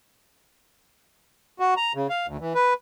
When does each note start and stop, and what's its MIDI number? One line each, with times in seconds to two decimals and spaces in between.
1.60 1.74 66
1.77 1.93 82
1.95 2.07 49
2.10 2.26 77
2.27 2.37 38
2.40 2.53 52
2.55 2.74 71